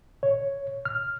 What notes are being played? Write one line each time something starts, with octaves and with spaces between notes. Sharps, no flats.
C#5
F6